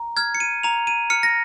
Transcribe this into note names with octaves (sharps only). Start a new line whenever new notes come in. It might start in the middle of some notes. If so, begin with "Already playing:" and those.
Already playing: A#5
F6 G#6
C#7
D#7
A#5 F7
D#7
F6 C#7
A#6